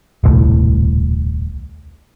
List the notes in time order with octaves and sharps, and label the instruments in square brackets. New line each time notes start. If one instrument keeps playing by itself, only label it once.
[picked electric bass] D#1 C2 A2